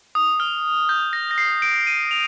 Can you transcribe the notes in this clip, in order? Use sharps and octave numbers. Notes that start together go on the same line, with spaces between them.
D#6
F6
G6
A#6
A#6
C7
D7
D#7
F7